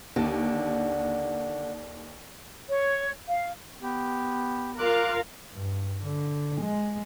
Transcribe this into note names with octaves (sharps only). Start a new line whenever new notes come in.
D#2 D3
C#5
F5
B3 G4
F4 A#4 F5 D6 F#6
G2
D3
G#3